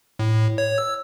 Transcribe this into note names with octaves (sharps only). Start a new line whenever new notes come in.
A2
C#5
E6